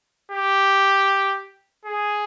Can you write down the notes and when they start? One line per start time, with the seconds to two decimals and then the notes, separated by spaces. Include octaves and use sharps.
0.31 G4
1.85 G#4